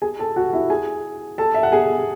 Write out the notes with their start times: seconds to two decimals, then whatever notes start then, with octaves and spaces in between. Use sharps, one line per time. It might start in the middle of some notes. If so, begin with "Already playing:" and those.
0.02 G#4 G#5
0.20 A4 A5
0.36 F#4 F#5
0.53 E4 E5
0.70 G#4 G#5
1.38 A4 A5
1.54 E5
1.63 F#5
1.72 G#4 G#5